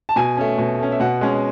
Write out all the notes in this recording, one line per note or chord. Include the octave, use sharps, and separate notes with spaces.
A5
B2 G#5
A3 C#4
B2
A3 C#4
E5
B2 F#5
G#3 C#4